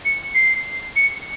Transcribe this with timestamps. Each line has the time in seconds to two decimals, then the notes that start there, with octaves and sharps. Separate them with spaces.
0.05 C#7
0.35 C7
0.96 C#7